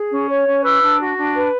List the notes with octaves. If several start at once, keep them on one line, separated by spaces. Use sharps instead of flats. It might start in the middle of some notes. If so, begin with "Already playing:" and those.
Already playing: G#4
C#4
C#5
C#4
B4 E6
D4
F#4
D4
B4